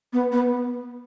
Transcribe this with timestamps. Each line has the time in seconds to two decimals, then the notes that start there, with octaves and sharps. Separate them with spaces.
0.13 B3
0.32 B3